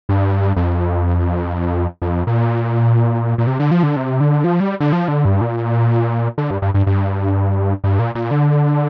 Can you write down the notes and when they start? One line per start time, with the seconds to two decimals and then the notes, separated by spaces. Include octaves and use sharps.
0.09 G2
0.56 F2
2.02 F2
2.27 A#2
3.38 A#2
3.47 C3
3.60 D3
3.71 F3
3.83 D3
3.96 C3
4.20 D3
4.44 F3
4.60 G3
4.80 D3
4.93 F3
5.08 D3
5.25 G2
5.41 A#2
6.38 D3
6.51 G2
6.62 G2
6.74 G2
6.87 G2
7.84 G2
7.99 A#2
8.15 A#2
8.31 D3